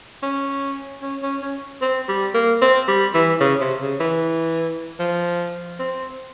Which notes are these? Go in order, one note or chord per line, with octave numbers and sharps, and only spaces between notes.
C#4
C#4
C#4
C#4
C4
G3
A#3
C4
G3
E3
C#3
C3
C#3
E3
F3
C4